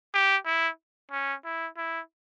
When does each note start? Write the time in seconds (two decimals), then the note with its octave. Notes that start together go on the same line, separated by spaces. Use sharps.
0.14 G4
0.46 E4
1.11 C#4
1.45 E4
1.77 E4